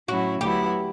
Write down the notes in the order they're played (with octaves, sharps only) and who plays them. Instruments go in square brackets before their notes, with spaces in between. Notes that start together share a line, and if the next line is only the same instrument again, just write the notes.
[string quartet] A2 F#3 C#4 E4 [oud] F#4
[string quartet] D2 D3 F#3 B3 E4 [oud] G4